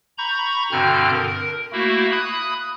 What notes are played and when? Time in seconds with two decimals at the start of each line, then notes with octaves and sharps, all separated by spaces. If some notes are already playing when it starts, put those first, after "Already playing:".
0.18 A#5 B5 C#6 G6
0.72 G2 B2 D3 C4 F6 G6
1.13 A#4
1.72 A3 A#3 E4 F#4
2.11 B5 D#6 F#6